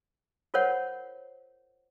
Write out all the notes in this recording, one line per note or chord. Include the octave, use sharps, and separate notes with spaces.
F4 A#4 C5 C#5 F#5